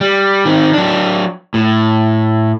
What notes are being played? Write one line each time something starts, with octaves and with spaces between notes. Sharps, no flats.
G3
D#3 C4
F#3 D4
A2